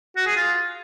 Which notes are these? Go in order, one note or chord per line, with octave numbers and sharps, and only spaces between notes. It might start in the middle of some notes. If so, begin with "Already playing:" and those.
F#4
G#4
F4